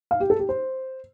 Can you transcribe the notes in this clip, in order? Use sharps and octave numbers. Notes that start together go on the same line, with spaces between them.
F5
G4
A4
G4
C5